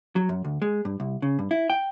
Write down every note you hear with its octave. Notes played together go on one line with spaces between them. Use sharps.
F#3
F#2
D2
G#3
G2
C2
C#3
G2
E4
G5